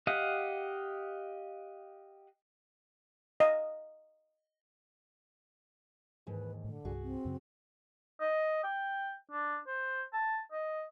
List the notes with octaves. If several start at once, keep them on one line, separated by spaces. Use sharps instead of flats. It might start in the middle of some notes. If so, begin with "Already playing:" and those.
G4 D#5 F5 F#5
D#5 F5
D#2 G#2 E3 B4
A2 D3
C2 G2 F#4 G#4
C4
F#2 C#3
D#5
G5
D4
C5
A5
D#5